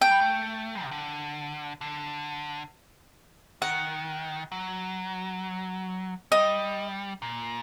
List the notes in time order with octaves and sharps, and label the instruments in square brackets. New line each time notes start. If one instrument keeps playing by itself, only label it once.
[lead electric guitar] A3 [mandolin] G5
[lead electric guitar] G3
A3
C3
D3
D3
[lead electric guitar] D#3 [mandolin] F#5
[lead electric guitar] F#3
[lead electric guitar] G3 [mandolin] D#5
[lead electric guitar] A#2